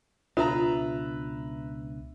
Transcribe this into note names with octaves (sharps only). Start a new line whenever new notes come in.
C#2 B2 D4 F4 B4 E5 A#5